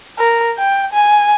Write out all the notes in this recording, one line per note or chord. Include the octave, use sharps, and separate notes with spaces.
A#4
G5
G#5